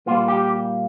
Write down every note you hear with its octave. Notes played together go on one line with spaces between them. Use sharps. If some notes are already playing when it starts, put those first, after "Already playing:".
A#2 G3 A#3 F4
G4